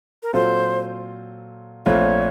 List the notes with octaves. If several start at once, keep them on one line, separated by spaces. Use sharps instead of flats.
A#4
A#2 F#3 C4 F4 A4 C5
A#1 A#2 A3 C4 F4 C#5